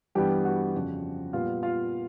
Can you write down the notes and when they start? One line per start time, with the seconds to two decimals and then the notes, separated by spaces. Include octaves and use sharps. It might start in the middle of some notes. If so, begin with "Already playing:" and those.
0.15 G2 E3 G3 B3 G4 G5
0.45 F#4 F#5
0.74 F2 C#3 F3
1.33 A#2 G3 B3 F4 F5
1.63 F4 F5